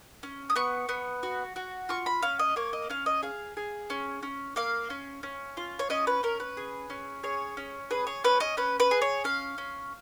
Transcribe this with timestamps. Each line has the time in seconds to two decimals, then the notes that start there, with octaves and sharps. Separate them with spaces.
0.23 C#4
0.50 D#6
0.56 B3 C#6
0.89 B3
1.23 F#4
1.56 F#4
1.89 F4 C#6
2.06 B5
2.23 C#4 F5
2.39 D#5
2.56 A#3 C#5
2.73 D#5
2.90 C#4 F5
3.06 D#5
3.23 G#4 F5
3.57 G#4
3.90 C#4
4.23 C#4
4.56 A#3 F5
4.90 C#4
5.23 C#4
5.57 F4
5.79 C#5
5.90 C#4 D#5
6.07 B4
6.23 C#4 A#4
6.40 B4
6.57 G#4
6.90 C#4
7.23 G#4 C#5
7.57 C#4
7.91 G#4 B4
8.07 C#5
8.24 C#4 B4
8.40 D#5
8.57 C#4 B4
8.80 B4
8.91 G#4
9.02 C#5
9.24 C#4 F5
9.58 C#4